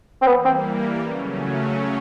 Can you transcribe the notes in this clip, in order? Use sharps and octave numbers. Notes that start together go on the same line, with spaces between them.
C4
E3 G3 A#3 B3
C4
C#3 F#3 A3 C#4